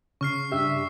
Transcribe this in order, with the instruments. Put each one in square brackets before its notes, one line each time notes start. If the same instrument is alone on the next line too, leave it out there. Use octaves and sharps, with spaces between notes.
[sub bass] C#3 [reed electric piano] C#4 [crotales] C#6 F6 C7
[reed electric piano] G2 D4 G4 [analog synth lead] E5